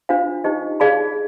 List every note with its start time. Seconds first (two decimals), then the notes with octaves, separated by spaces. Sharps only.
0.09 D4 F4 C5 F5
0.44 D#4 G4 C5 D#5
0.80 G#4 D5 F5 B5